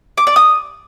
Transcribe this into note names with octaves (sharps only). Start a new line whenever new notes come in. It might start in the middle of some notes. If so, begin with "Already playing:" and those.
D6
D5
D#6